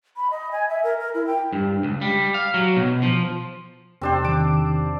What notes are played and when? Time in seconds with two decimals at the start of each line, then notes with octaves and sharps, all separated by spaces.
0.16 B5
0.31 D#5
0.52 G#5
0.69 E5
0.84 A#4
1.00 A#4
1.15 E4
1.27 G5
1.53 G2
1.83 C#2
2.01 G3
2.34 F5
2.54 F#3
2.76 B2
3.02 F3
4.01 E2 C3 C4 D4 G4 C5
4.24 D#3 D6